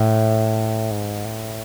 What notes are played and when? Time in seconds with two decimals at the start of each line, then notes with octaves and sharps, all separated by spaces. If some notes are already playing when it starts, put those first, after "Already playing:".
Already playing: A2
0.91 G#2
1.25 A2